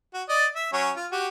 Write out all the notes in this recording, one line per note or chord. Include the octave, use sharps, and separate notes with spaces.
F#4
D5 D#5
E5
F#3 C#4
F4
F#4 G4